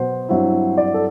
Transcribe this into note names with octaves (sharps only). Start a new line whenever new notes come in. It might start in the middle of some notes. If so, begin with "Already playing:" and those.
Already playing: B2 F#3 B3 C5
G2 F#3 C4 E4
D5
A4